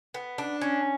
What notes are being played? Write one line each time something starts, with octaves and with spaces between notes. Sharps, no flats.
B3
D4
C#4